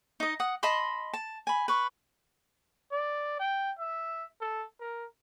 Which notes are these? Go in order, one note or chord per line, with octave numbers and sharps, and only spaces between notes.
D#4 D#5
F#5 D#6
D#5 A5 B5 C6
A5
G#5 B5
B4 C#6
D5
G5
E5
A4
A#4